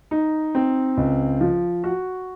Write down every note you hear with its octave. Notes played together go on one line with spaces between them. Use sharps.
D#4
C4
C#2
F3
F#4